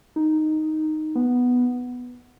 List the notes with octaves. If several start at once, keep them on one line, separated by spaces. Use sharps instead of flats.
D#4
B3